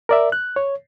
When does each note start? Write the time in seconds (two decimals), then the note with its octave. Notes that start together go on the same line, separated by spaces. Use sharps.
0.09 A#4 D5 E5
0.32 F#6
0.56 C#5